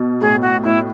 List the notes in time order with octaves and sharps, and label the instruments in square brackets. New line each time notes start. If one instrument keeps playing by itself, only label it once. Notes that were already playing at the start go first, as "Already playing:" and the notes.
Already playing: [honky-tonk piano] B2
[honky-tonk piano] A2 [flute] G#4
[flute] F#4
[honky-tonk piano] A2 [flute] E4